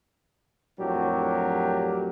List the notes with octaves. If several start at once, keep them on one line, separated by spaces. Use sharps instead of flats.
F2 A2 F#3 D4 G4 A#4